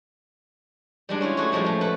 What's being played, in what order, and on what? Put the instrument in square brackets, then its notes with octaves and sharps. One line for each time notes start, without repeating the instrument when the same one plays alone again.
[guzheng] G3 G#3 D4
C#4 E4 F4
A3 F#4 G#4 C#5
A2 F3 G3 G#3 C#4
G#3 A3
A4 B4 F#5